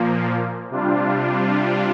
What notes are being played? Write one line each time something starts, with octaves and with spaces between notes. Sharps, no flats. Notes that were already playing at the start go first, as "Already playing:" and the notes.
Already playing: A#2 F3 A#3
C3 G3 D4 F4